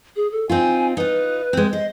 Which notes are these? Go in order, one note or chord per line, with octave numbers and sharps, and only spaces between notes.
G#4
A4
C4 D#4 F4 G#5
D#4 F4 B4
G#3 C4
C5 D#5